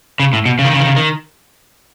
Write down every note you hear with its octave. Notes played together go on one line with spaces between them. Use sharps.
C#3
A2
B2
C#3
D#3
C#3
D#3
C#3
D#3